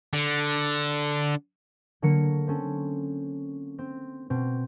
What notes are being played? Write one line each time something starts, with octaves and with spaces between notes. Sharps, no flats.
D3
D3 F#3 A#3 A#4 C#7
C4 C#4 A4
C4
B2 C4